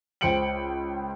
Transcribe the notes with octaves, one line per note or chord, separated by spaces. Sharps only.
C#2 C5 G5 C#7 D7 F#7